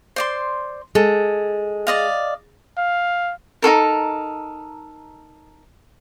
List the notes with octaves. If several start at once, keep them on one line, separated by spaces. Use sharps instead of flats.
C5 D5 C6
G#3 A4
D5 D#5 F5
F5
D#4 F4 A4 A#4